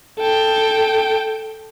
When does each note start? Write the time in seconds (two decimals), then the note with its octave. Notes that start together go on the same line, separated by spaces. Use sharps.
0.19 A4 G5